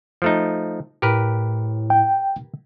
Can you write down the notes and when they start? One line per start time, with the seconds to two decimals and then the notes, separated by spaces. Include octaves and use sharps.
0.22 F3 A3 D#4
1.02 A2 G4 A#4 B4
1.90 G5